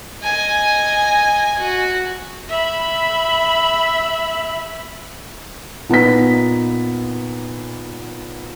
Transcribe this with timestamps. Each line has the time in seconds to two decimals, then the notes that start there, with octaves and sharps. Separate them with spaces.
0.22 D#5 G#5
1.58 F#4
2.49 E5 B5
5.89 A#2 B3 D#4 B6